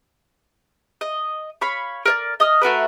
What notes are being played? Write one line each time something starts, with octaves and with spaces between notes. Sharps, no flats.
D#5
C#5 F5 B5 C#6
A#4 C#5 D5
D#5 D#6 F6
A3 F#4 A#4 B4